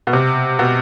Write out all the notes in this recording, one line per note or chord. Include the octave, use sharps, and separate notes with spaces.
B2
C3
B2